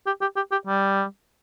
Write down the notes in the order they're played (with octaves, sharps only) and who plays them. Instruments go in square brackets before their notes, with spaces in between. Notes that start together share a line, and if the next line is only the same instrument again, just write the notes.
[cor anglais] G4
G4
G4
G4
G3